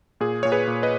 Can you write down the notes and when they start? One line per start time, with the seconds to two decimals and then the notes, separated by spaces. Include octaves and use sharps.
0.20 A#2 G#4
0.43 A#2 C#5
0.52 G#4 B4
0.67 A#2
0.83 B4 D#5